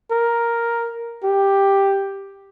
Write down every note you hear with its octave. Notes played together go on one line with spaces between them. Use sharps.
A#4
G4